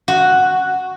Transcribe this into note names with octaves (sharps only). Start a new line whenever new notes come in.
F#4